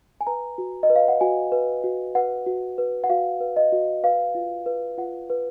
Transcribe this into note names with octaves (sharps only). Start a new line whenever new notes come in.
G#5
B4 A#5
F#4
D#5
B4
F5
F#5
F#4 G#5
B4
F#4
B4 F#5
F#4
B4
F#5
F#4 F5
B4
D#5
F#4
B4 F5
F4
B4
F4 F#5
B4